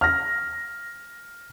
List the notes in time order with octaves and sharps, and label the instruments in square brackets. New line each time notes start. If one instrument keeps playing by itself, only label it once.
[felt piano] F6 A#6